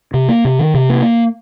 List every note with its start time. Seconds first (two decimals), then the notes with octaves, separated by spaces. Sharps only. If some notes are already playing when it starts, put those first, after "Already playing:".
0.14 C3
0.29 A#3
0.45 C3
0.59 D#3
0.74 C3
0.90 A#3